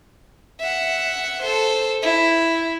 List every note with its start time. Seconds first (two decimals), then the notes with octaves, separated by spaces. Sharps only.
0.61 E5 F#5
1.43 A4 C5
2.02 E4